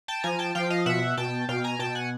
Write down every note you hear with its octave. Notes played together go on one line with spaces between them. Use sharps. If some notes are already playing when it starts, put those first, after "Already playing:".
G5 A5
F3 G#5 A#5
G5 A5
F3 F5 G5
D#5 F5
B2 E5 F#5
B2 G5 A5
B2 F5 G5
G#5 A#5
B2 G5 A5
F#5 G#5